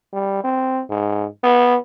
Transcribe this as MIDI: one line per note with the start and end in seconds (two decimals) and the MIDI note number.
0.13 0.41 55
0.44 0.82 60
0.90 1.26 44
1.43 1.76 59